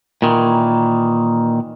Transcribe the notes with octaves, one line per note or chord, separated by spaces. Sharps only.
A#2 D#3 E3